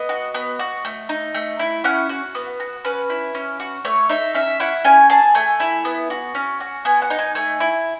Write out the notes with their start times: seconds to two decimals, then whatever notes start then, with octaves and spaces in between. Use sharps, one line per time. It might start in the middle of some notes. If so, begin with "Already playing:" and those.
Already playing: B3 D#5
0.09 F#4
0.34 B3
0.59 F#4
0.85 A3
1.09 D#4
1.35 A3
1.59 E4
1.84 C#4 F#5
2.09 F#4
2.35 B3
2.60 F#4
2.85 C#4 B4
3.10 E4
3.35 C#4
3.60 F#4
3.85 A3 C#5
4.10 D#4 E5
4.35 C#4 E5
4.60 E4 F#5
4.84 C#4 G#5
5.10 G#4 A5
5.35 A3 G#5
5.60 E4
5.85 B3
6.10 F#4
6.35 C#4
6.60 F#4
6.85 B3 G#5
7.02 F#5
7.10 D#4
7.19 G#5
7.35 A3 G#5
7.60 E4